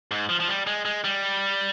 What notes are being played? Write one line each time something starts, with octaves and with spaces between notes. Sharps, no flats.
G#2
F3
F3
G3
G#3
G#3
G3